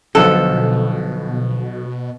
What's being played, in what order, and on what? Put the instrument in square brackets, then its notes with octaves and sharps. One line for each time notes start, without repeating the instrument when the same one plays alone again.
[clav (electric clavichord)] B1 F#5 [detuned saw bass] B2 [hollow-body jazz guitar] D3 F3 [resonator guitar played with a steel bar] A4